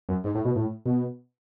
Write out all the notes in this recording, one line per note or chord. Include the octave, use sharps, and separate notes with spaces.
F#2
G#2
A2
B2
A2
B2